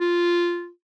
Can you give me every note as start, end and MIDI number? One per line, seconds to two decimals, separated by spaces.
0.01 0.69 65